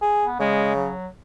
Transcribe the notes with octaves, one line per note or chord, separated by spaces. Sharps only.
G#4
B3
C#3 G#3
F#3